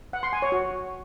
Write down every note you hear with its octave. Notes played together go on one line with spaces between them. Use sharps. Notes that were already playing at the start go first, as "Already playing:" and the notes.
F#5
C6
G#5
C#5
F#4